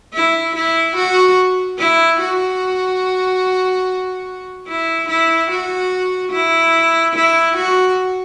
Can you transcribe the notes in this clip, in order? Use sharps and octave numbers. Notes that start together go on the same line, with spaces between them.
E4
E4
F#4
E4
F#4
E4
E4
F#4
E4
E4
F#4